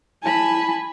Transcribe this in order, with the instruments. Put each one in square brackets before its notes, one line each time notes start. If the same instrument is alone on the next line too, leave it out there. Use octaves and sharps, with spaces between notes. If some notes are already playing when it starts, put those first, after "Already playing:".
[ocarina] E4 [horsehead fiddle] G#5 B5 [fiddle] A5